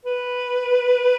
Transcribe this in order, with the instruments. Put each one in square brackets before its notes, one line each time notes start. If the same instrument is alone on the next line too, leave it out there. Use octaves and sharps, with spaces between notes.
[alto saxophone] B4